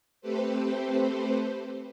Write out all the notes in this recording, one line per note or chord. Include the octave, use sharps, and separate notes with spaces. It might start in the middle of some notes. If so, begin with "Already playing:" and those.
A3 C4 G4 A4 B4 C5